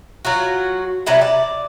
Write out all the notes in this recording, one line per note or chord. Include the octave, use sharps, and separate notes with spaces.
F#3 F4 F#4
C3 F#3 G3 E4
D5